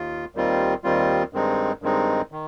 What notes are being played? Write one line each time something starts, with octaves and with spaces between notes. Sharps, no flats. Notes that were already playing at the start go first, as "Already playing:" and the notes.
Already playing: D#2 F4
D#2 D#3 G3 C4 F4
D#2 D#3 G3 C4 F4
G2 D#3 G#3 C4 D#4
G2 D#3 G#3 C4 D#4
D#3